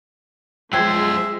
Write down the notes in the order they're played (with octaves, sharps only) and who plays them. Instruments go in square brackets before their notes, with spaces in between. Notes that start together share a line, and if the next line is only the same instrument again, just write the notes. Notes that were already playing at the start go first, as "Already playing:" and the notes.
[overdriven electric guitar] F#2 C5 [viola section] F3 G#3 [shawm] E5 [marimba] G5 G#6